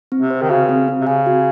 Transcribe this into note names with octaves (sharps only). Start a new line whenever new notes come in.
C4
C3
C5
D#3
C#3 F#4
C4
C4
C3
C#3 G#5
F#4